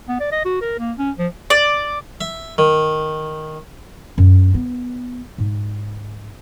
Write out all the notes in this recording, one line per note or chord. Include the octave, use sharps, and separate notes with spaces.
B3
D5
D#5
F#4
A#4
A#3
C#4
F3
D5
E5
D#3
F#2
B3
G#2